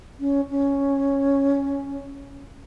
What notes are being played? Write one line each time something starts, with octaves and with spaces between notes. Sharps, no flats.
C#4
C#4